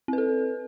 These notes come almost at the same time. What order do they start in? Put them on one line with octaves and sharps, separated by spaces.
C4 B4 A4